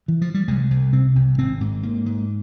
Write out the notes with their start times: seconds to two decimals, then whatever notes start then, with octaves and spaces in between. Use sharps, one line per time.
0.08 E3
0.22 F3
0.34 G3
0.48 C2 G#3
0.71 C2
0.93 C3 C4
1.16 C2
1.38 G#1 C4
1.61 G#2
1.83 G#2 A#3
2.06 G#2